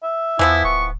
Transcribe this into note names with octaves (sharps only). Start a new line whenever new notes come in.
E5
E2 E3 F3 B3 E4
D1 C#6